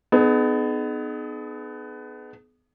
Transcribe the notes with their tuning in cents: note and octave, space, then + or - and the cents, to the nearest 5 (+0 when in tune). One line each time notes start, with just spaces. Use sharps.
B3 +20 D#4 -30 G#4 +35